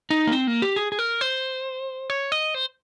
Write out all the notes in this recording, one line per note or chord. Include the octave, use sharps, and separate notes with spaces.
D#4
A#3
C4
A#3
G4
G#4
G#4
A#4
C5
C#5
D#5
C5